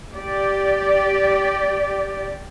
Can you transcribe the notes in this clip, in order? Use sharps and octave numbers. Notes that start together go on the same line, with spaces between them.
G4 D5